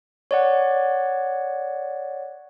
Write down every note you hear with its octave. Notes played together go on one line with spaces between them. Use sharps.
C#5 D5 F#5